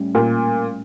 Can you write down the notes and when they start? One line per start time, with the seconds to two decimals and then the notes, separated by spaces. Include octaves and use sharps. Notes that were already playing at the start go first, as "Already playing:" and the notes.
Already playing: A2 G3 C#4
0.15 A#2